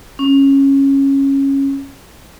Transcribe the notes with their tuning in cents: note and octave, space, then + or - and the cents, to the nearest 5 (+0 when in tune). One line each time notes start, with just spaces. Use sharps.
C#4 -15